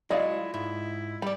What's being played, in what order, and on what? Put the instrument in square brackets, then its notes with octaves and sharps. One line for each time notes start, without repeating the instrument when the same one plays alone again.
[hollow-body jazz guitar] F#3 G#3 [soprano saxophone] E4 [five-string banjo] F4 D5 F5 [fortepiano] D#5
[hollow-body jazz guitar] G#2 [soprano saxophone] E4
[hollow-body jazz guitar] G3 D5 [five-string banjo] B5